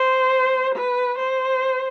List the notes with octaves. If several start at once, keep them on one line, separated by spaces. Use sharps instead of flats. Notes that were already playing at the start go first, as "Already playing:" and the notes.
Already playing: C5
B4
C5